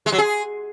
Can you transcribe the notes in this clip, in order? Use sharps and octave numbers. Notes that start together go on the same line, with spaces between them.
G#3
F#3
G#4